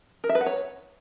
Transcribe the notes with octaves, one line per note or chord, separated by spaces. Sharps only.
A#4
E5
B4
F#5
C#5